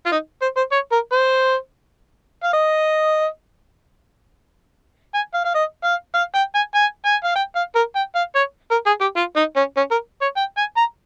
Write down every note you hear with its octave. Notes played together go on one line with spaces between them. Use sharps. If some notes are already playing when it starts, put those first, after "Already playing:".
F4
D#4
C5
C5
C#5
A#4
C5
F5
D#5
G#5
F5
F5
D#5
F5
F5
G5
G#5
G#5
G#5
F5
G5
F5
A#4
G5
F5
C#5
A#4
G#4
G4
F4
D#4
C#4
C#4
A#4
C#5
G5
G#5
A#5